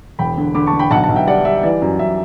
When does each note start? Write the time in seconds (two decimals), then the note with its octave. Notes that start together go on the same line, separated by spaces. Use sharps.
0.19 E1 G5 B5
0.38 D3
0.55 D3 B5 D6
0.67 A5 C#6
0.73 D3
0.79 G5 B5
0.91 B1 F#5 A5
1.03 F#5 A5
1.09 B1
1.16 E5 G5
1.27 G3 D5 F#5
1.45 G3 E5
1.63 E3 D5
1.82 F#2
1.99 F#2 E5